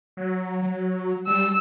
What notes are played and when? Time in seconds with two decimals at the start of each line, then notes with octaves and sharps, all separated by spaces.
0.17 F#3
0.62 F#3
1.27 G3 E6